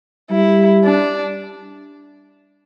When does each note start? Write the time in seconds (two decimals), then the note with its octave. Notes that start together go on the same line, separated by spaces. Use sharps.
0.31 G3 E4
0.85 D4